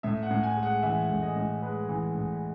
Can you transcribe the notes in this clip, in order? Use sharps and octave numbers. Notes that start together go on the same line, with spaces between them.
A2 E5
F#5
A2
G#5
G#3
F#5
E3 E5
A2
D#5
A2
G#3 B4
E3
A2